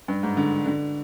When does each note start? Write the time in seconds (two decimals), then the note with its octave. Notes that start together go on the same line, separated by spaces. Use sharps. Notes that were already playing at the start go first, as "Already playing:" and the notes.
0.08 G2
0.23 G#2
0.37 D3
0.66 D3